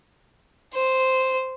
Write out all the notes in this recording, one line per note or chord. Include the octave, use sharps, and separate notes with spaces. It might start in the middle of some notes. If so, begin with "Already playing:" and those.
C5